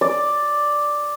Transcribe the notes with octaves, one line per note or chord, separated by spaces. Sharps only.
D5